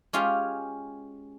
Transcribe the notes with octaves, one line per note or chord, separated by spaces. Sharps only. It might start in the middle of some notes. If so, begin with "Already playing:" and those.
G#3 C#4 F4 G4 F5